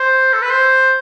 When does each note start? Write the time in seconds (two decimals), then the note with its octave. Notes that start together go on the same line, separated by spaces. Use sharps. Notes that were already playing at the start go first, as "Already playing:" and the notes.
Already playing: C5
0.33 A4
0.42 B4
0.51 C5